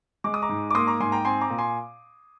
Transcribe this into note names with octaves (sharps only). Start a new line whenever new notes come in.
G#3 D6
D#6
A#5 D6
G#2
D6
A#3 C6 D#6
A#5 D6
G#2 G#5 C6
G5 A#5
C4 G#5 C6
A#5 D6
A#2
G#5 C6